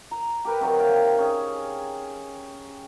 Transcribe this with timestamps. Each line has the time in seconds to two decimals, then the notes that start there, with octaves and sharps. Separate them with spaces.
0.11 A#5
0.45 G4 A#4 B4
0.60 C3 D#3 F#3
0.79 F5 G5
1.18 C#4 G#4